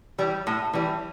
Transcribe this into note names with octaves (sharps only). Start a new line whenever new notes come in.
E3 G3
A2
E3 G3